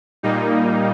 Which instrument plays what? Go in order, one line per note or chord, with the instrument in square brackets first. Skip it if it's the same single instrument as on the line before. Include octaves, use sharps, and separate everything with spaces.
[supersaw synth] A#2 G3 A#3 D#4